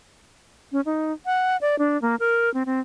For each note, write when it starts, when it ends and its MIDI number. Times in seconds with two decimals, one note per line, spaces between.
0.72 0.81 61
0.86 1.12 63
1.26 1.57 78
1.61 1.78 74
1.79 2.00 62
2.02 2.16 58
2.20 2.52 70
2.54 2.63 60
2.66 2.80 60